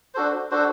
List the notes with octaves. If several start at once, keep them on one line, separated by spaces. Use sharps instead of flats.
D4 F#4 A4 C5
D4 F#4 A4 C5